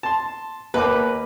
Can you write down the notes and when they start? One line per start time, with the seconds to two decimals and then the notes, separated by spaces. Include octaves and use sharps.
0.03 A5 C6
0.74 D#2 A#3 B4 D6